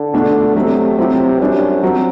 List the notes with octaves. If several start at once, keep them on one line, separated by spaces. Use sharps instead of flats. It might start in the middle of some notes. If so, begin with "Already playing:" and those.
Already playing: D3
B2 A3 D4
C3 F#3 A3 C4
C3 F#3 C4 E4 G4
F#2 G3 D4 G4
F#3 C4 F#4